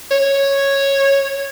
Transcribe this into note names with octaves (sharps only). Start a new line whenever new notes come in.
C#5